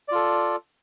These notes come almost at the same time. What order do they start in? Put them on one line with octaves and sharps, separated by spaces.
D5 F4 A4